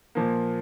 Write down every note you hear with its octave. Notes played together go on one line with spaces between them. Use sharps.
A#2 F3 A#3